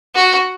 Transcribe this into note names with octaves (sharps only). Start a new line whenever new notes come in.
F#4